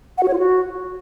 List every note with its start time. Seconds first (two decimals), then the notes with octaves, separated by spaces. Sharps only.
0.18 F#5
0.23 F#4
0.28 C#5
0.33 F4
0.38 F#4